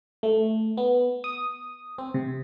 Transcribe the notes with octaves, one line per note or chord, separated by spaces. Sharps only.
A3
B3
D#6
C4
C3